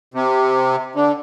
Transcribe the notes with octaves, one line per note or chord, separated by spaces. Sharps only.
C3
D3